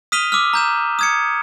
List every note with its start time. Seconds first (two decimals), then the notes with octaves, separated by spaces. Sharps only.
0.12 D#6 F6 B6 D#7 F7 G7
0.32 D6 E6 F6
0.53 A#5 G6 E7
0.99 D#6 G#6 C#7